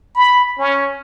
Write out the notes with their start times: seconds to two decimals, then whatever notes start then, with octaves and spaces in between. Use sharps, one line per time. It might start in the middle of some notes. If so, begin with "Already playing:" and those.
0.15 B5
0.59 C#4